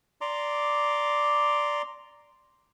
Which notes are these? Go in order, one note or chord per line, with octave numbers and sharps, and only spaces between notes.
D5 A#5 C6 D6